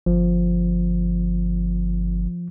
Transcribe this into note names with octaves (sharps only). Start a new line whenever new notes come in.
G1 F3